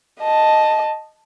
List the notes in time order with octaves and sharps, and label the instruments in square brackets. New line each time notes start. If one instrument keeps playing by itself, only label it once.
[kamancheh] D#5 A5